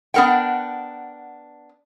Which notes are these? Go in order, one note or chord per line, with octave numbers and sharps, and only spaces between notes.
B3 D4 A#4 F#5 G5